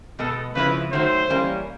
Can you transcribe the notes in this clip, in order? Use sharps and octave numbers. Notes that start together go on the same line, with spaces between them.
B2 G#3 B3 A4
C#3 F3 G#3 C4 E4 B4
D#3 F#3 A3 C5
E3 G3 A#3 C#4